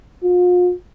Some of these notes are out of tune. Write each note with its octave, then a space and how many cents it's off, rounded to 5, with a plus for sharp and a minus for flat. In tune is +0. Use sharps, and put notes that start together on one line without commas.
F4 +40